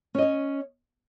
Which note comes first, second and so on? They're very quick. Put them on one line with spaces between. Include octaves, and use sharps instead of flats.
C#4 D#5 C#5